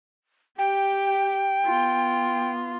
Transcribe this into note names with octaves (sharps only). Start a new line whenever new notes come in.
G4 G5
B3 F4